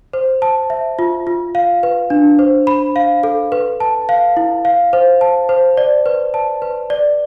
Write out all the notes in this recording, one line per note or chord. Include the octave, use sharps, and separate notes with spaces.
C5
A5
E5
F4
F4
F5
B4
D4
C5
B5
F5
A4
B4
A5
F5
E4
F5
C5
A5
C5
D5
B4
A5
B4
D5